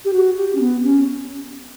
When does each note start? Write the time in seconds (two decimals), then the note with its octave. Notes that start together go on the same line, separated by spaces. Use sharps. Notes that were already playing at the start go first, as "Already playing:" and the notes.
0.05 G4
0.13 F#4
0.37 G4
0.55 C#4
0.61 B3
0.84 C#4